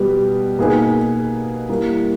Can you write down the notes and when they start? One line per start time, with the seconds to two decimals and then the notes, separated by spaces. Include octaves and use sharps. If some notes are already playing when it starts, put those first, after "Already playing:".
Already playing: B2 G3 B3 G4
0.58 B2 A#3 D#4 G#4 B4
1.69 G3 A#3 E4 A#4